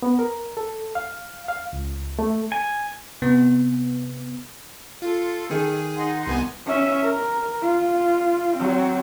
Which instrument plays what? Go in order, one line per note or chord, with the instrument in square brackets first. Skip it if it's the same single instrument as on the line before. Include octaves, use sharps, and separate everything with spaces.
[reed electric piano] B3
A#4
A4
F5
F5
C#2
A3
[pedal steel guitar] G#5
[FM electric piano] C3 B3
[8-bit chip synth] F4 [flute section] A4
[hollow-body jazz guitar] D#3 [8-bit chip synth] G#4
[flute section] D#4 F#5 C6
[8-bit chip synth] C2 B3 G#5
[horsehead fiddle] C#4 E5
A#4
F4
F#3 C4